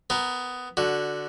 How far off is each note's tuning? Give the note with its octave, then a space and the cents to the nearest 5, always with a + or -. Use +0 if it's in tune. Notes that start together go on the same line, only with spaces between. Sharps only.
B3 +15 A#4 +0
D3 +0 F#4 +0